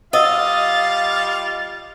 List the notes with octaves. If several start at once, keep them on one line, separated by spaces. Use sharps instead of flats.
G3 F4 D#5 F5 F#5 D#6 E6 A6